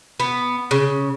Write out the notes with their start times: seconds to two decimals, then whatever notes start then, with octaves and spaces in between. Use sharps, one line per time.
0.20 B3
0.71 C#3